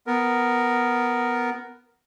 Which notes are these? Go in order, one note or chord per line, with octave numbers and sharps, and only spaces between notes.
B3 A#4